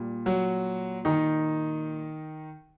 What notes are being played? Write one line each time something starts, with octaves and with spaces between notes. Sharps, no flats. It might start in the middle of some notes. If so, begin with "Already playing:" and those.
Already playing: A#2 G3
F#3 F#4
D#3 D#4